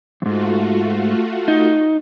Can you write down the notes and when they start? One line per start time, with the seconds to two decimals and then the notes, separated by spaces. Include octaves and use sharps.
0.22 F2 G#2 A3 F4 F#4
1.48 D#4